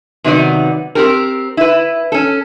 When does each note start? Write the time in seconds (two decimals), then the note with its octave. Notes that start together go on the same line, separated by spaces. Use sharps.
0.24 C3 D#3 F#3 B3 D#4 D5
0.95 C4 G4 A#4
1.57 E4 B4
2.12 C#4 A4